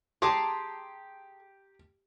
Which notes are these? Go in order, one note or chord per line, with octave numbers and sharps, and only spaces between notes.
G4 G#4 A5 A#5 C6 D6